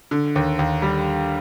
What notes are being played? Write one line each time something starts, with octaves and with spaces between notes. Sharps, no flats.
D3
D#2
D#2
G3